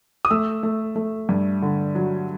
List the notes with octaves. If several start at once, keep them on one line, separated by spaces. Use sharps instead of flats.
D#6
A3 E6
A3
A3
G2
D3
F#3